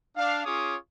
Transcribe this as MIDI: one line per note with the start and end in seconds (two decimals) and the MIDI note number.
0.16 0.42 62
0.16 0.42 77
0.45 0.75 61
0.45 0.75 65
0.45 0.75 68
0.45 0.75 73
0.45 0.75 86
0.45 0.75 87